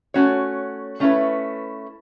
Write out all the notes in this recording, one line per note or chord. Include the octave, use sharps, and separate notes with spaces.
A3 C#4 F#4 C#5
A3 C#4 E4 B4